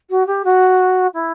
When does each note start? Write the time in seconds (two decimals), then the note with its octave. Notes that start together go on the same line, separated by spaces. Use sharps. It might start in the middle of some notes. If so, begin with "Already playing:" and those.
0.10 F#4
0.27 G4
0.45 F#4
1.14 E4